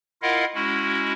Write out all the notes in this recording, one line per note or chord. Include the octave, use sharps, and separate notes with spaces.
E4 F4 A#4 D#5 F5 F#5
G#3 C#4 E4 F#4